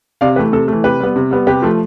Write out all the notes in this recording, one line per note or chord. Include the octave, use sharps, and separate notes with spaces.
C3 D5 F5
E3 A3 G4 B4
C3 A4
E3 A3
C3 G4 B4
G3 B3
C3
G3 B3
C3 G4 B4
F3 A3